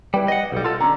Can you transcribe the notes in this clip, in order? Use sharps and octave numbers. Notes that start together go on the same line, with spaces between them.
G3 E4 B4 G5
C#5 D#5 F#5
B1 G3
F4 A4
D3 C#4 C#5 A#5